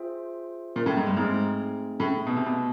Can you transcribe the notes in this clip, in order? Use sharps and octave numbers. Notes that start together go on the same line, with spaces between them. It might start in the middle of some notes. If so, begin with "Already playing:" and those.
Already playing: F4 G#4 C5 E5 G5
A#2
A2
G#2
G2
G#2 A3 C4 D#4 G#4
A2
B2
C3
B2